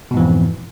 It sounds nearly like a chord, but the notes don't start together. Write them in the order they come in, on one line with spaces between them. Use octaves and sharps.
B2 G#2 E3 F2